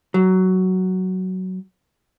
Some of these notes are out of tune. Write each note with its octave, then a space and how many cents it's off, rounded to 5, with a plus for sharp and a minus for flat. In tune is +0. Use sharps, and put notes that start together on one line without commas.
F#3 +10